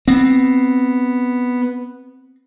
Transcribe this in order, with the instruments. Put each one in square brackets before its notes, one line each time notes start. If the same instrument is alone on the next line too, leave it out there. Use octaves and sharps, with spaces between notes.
[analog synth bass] B3 [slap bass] C4